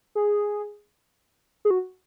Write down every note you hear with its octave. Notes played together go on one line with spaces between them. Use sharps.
G#4
G#4
F#4